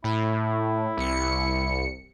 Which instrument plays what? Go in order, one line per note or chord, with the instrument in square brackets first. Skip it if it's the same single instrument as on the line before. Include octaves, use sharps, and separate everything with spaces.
[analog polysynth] A2 [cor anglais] E4
[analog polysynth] C2 C#7